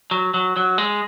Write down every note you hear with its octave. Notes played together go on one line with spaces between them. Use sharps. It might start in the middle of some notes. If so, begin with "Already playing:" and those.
F#3
F#3
F#3
G#3